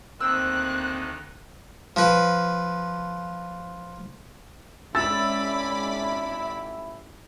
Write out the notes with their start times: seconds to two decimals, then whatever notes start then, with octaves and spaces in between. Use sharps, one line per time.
0.20 D2 D#3 A#3 C4 E6 F#6
1.96 F3 B4
4.95 G#1 G#3 C#4 E4 D5 B5 E6 A6